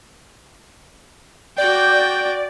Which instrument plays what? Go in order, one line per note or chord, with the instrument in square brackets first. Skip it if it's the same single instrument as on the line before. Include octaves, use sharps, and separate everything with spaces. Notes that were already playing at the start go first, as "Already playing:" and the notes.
[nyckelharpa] F#4 G5 [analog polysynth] D5 [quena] G6